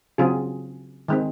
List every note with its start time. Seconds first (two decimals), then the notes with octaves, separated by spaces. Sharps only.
0.18 C#3 F#3 C4 F4 G#4
1.08 D#3 G#3 C4